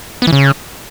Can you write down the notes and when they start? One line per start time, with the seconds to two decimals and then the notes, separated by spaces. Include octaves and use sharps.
0.22 B3
0.27 E3
0.32 C#3